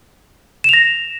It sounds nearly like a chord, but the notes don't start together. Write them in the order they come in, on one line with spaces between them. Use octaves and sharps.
E7 F7 A#6